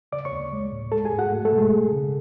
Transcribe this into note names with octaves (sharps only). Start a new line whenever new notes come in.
C#3 D5 D6
C#5 C#6
D2
G#3
A2
G#3 A4 A5
G#4 G#5
G#2
F#4 F#5
A3
A3 A4
B2
G#3 G#4
G#3
C#3